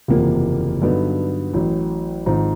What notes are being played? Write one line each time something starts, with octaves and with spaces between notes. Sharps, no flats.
F#1 E2 C3 F3 A#3
G2 D3 F#3 B3 D#4
A1 A2 F#3
G#1 G#2 F3